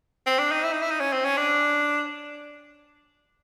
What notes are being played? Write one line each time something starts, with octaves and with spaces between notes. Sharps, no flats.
C4
D4
D#4
E4
D#4
E4
D#4
C#4
C4
C#4
D4